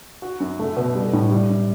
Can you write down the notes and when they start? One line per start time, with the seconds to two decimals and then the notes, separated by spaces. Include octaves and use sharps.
0.22 F#4
0.40 F#2
0.59 A3
0.77 B2
0.95 G3
1.13 A2
1.31 G3
1.49 F#2